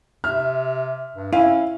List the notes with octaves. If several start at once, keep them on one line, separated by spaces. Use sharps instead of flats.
C3 E5 F6
G2
C#4 E4 F5